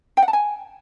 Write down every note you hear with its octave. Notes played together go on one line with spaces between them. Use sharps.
G5
F#5
A5
G#5